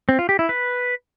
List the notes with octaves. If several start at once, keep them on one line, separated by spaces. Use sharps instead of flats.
C4
F4
G4
E4
B4